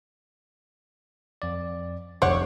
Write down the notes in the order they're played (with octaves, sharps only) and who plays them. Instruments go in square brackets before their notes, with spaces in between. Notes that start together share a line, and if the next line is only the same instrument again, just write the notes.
[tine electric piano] F2 D5
[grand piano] F1 [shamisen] C5 F#5 [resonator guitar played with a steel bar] C#5 [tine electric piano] D6